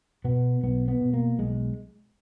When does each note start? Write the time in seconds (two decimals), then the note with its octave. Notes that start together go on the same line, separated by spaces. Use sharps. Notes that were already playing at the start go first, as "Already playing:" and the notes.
0.24 B2 B3
0.63 B1 B3
0.88 B3
1.01 B2
1.14 A#3
1.38 B1 G#3